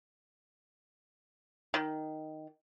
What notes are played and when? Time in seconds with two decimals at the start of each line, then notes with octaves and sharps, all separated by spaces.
1.74 D#3